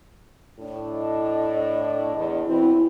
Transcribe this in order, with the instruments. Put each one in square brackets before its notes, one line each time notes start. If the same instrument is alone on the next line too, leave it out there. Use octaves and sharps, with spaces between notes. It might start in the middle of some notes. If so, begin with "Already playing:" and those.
[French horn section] A2 D4
[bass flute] D#5
[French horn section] E2
[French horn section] B2 E3 C4 [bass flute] E4